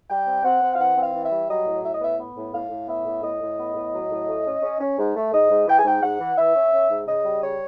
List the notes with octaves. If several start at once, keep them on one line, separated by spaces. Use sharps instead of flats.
G3 G5
C4
C4 F#5
C4
F5
E3 F#5
C4
F5
E3
E5
G3
F#3 D#5
A2
A2 E5
D#5
B3 E5
B3
A2
A2 F5
A2
B3 E5
A2
A2 D#5
A2
B3
A2
F#3
A2
A3
C#4
C#4
C#4
G#2
A3
G#2 D#5
G#2
E3 G5
G#5
G#2 G5
G#2 F#5
E3
E3 E5
C#4
C#4
G#2
C#3 D#5
G3
C#3 C#5